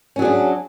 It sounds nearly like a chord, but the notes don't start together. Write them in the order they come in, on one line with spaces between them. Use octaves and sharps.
C#4 F#3 G#4 D4